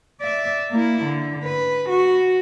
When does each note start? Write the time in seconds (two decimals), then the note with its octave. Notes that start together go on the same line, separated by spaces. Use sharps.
0.20 D5 E5
0.71 A#3 E4
1.04 D3
1.44 B4
1.90 F#4